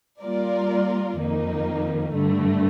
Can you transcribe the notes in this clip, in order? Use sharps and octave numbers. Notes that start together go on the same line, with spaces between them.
G3 A#3 F4 A#4 D5
F2 D#3 A#3 D#4
G2 D3 A3